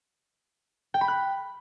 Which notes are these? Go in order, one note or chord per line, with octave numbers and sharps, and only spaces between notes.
G5
B5
F#6